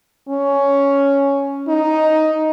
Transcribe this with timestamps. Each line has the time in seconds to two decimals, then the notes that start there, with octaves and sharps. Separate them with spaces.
0.29 C#4
1.68 D#4